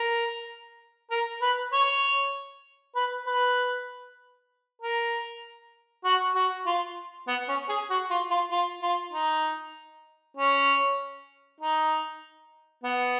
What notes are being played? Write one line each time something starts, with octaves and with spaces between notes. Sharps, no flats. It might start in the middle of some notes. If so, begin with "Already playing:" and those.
Already playing: A#4
A#4
B4
C#5
B4
B4
A#4
F#4
F#4
F4
B3
C#4
G#4
F#4
F4
F4
F4
F4
D#4
C#4
D#4
B3